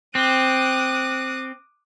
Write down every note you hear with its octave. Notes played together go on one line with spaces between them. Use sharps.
C4 D6 D#6 F#6